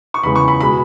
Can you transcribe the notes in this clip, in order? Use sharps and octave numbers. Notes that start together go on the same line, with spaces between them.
C#6
E2 C#3 G#3 B5
C#6
B5
B2 G#3 B5